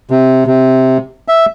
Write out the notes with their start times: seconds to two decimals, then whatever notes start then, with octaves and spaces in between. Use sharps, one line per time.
0.11 C3
0.47 C3
1.28 E5